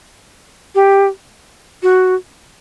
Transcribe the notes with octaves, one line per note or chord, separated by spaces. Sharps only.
G4
F#4